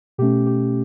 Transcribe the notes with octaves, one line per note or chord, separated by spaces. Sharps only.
B2 A3 C#4 G4
G4